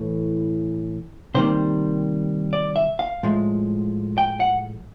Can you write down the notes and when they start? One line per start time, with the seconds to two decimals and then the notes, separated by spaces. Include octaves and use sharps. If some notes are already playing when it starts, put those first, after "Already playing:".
Already playing: A2 E3 A3
1.34 C3 D#3 G3 A#3 C5
2.53 D5
2.76 E5
2.99 F5
3.23 A2 F3 G#3
4.18 G5
4.40 F#5